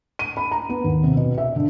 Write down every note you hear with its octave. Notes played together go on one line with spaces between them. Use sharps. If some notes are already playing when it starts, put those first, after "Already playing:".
D#7
B5
A#5
B3
D#2
C3
B2
E5
D3